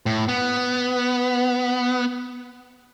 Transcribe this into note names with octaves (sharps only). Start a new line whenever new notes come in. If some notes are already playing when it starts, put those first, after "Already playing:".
A2
B3